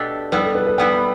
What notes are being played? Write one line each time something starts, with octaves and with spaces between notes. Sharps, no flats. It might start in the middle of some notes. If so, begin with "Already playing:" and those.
Already playing: B2 A3 D4 G4
G3 B3 E4 B4
A4
B4
B4
G3 B3 E4 G5
B5